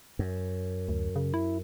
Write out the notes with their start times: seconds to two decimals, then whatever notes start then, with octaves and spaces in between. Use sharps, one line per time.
0.19 F#2
0.89 D2
1.16 C#3
1.34 E4